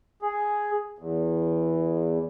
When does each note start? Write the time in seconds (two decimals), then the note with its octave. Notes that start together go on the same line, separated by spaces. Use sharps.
0.22 G#4
0.99 E2